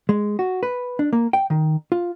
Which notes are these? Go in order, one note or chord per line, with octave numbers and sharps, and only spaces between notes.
G#3
F#4
B4
D4
A#3
G5
D#3
F4